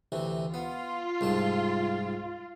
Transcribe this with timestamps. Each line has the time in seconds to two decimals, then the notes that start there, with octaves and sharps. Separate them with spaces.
0.12 D2 C3 E3
0.54 B3 F4
1.21 C2 G#2 A5